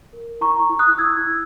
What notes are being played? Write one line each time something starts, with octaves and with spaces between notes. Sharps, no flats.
A#4
E4 A#5 C#6
E4
D#6 F#6
E4 E6 G#6
E4